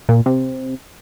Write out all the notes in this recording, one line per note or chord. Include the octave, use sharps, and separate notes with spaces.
A#2
C3